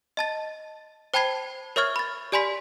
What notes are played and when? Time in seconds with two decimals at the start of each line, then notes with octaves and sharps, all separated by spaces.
0.17 D#5 A5 A6
1.14 C5 G5 A5 B5 G#6 C7
1.76 A#4 C#5 E5 C#6 F6 G#6
1.96 B5 A6
2.32 G4 D5 G#5 B5 C6 B6